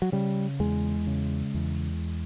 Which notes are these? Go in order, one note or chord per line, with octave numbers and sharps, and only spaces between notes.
F#3
C#3 G3
E2 G#3
C#3
E2